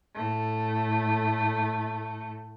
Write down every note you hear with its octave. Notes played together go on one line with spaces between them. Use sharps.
A2 A3